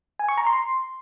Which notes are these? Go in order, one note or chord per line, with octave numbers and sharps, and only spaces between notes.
G#5
C#6
A#5
C6